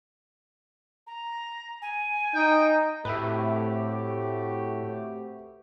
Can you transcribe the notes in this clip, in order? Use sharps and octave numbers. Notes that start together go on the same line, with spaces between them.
A#5
G#5
D#4 G5
A2 A3 C4 F#4 G4 B4 E5